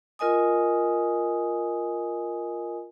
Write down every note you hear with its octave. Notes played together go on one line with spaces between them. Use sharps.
F4 A#4 D#5 G#5 D#6